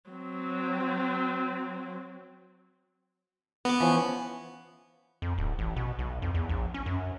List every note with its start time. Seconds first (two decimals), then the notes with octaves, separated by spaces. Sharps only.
0.11 F#3 C4
3.65 B3 A#5 D6
3.80 E3 F3 C#4
5.22 F2
5.38 D1
5.59 A1
5.76 B2
5.99 B1
6.22 F2
6.34 E2
6.49 A#1
6.74 C#4
6.86 F#2